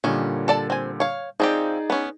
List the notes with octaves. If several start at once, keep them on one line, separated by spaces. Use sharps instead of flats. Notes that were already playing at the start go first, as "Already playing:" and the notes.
A#2 D3 D#3 G3 C#4
A4 D5 A5
C4 G#5
C#5 F5
F3 C4 D#4 G4 G#4 D5
B3 C#4